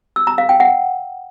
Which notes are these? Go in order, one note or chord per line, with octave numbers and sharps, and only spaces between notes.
E6
A#5
F5
G5
F#5